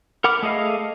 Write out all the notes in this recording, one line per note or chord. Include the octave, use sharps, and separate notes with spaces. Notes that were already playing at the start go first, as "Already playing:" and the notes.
A#4 F#5 B5 D6 F6
A3 G#4 A4 D#5 F5